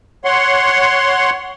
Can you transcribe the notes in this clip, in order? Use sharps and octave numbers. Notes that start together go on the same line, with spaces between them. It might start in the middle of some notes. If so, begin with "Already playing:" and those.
C#5 F#5 C6